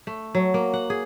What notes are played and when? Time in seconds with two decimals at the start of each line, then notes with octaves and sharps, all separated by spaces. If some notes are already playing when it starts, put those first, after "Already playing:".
0.07 A3
0.35 F#3
0.54 A#3
0.74 F#5
0.90 G#4